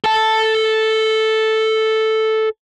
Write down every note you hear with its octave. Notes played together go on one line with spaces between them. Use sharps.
A4 A5